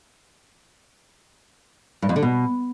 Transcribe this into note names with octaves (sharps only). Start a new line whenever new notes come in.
G2
F2
D3
B2